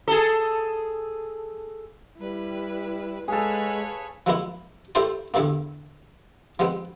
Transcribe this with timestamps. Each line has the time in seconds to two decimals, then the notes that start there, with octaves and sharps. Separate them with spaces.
0.08 G#4 A4
2.19 G3 E4 B4
3.28 G#3 G#4 A4 B4 C#5 F5
4.26 F3 F#3 G#3 A#3 B3 E4
4.95 A3 E4 G4 A#4 C5 D5
5.34 E2 A2 D3 E3 G3 A#3
6.59 F3 G3 G#3 B3 C4